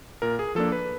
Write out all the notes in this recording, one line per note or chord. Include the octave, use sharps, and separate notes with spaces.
A#2 A#4
G#4
F3 A#3 D4 A4
B4